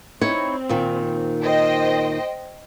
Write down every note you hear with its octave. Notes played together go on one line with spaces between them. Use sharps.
C4 D#4 E4 C#5
A#2 D#3
C5 D#5 G5